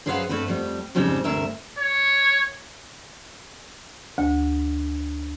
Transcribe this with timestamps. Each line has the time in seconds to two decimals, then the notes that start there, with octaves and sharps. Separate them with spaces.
0.06 F#2 G#4 B4 C5 F5 F#5
0.29 G2 A3 C4 B4
0.48 F2 G3
0.95 F2 G#2 C#3 G3 C4
1.24 D2 G2 C3 A#4 E5
1.78 C#5
4.18 D2